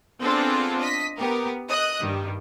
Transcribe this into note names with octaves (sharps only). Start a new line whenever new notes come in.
B3 C4 D4 F4 G#4 A4
D#5 B6
B3 G4 A#4
D#5 D#6 F#6
G2 D#3 G3